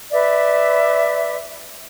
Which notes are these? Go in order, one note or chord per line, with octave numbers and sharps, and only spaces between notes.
B4 D5 E5